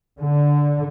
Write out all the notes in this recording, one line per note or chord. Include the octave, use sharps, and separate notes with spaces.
D3